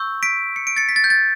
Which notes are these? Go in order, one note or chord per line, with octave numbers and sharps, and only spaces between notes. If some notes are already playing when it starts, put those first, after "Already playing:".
Already playing: C#6 E6 G6
B6 D7
C#7
D7
A6 C#7
B6
A6
G6
A6